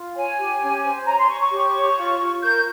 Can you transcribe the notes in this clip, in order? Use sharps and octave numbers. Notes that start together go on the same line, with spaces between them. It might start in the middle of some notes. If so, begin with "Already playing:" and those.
Already playing: F4
C#5 G#5
G4
C#4
C5
C#5 A#5
C6
C#5 C#6
C#6
G4
C#5
F4
F4
A#4 G6